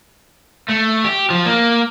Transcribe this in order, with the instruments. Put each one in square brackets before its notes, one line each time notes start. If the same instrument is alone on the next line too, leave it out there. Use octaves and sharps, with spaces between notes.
[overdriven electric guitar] A3
G4
F3
A#3